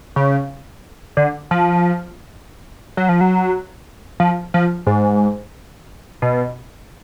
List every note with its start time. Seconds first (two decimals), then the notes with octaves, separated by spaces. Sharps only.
0.16 C#3
1.17 D3
1.51 F3
2.97 F#3
3.09 F3
3.21 F#3
4.20 F3
4.54 F3
4.87 G#2
6.22 B2